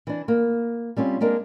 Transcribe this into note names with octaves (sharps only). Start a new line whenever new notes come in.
E3 D4
A#3
G3 C4 C#4 F4
G#3 A#3 D4 A#4